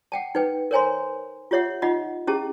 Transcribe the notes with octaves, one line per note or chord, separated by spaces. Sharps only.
F#5 G5 A5
D#4 B4 G5
A#4 C5 C#5 G#5 A#5 C6
F4 G4 C#5 E5 F#5
D#4 F4 D#5 F#5 B5
C#4 E4 G4 G#4 A5